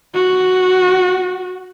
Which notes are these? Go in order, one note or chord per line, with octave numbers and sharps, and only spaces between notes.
F#4